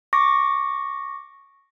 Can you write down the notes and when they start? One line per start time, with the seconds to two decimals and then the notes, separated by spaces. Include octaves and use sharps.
0.13 C#6 D6 A#6